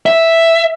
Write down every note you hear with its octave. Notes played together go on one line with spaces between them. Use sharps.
E5